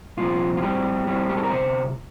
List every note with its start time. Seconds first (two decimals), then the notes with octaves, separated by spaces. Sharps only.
0.17 C2 A#2 F3 C4 F4
0.57 F4
0.62 A2 G3 C4 G4
1.07 A2 G3 C4
1.29 G4
1.37 A4
1.43 A#4
1.51 D2 C3 C5